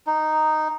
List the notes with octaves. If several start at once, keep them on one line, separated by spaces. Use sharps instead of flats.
D#4